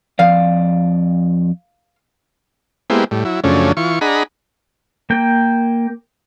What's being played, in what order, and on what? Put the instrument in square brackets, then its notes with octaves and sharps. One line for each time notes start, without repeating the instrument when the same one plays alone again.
[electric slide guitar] F2 F3 D5 [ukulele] F5
[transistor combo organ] G#3 A#3 B3 E4 G4 C5
A2 G3
F#3 E4
F#2 C#3 F3 A3 C#4 D4
E3 F4 C#6
D4 G#4 D#5 F#5 A#5 B5
[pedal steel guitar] A#3 G5